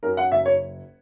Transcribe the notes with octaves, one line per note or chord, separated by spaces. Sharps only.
F#2 A#4
F#5
F#1 E5
C#5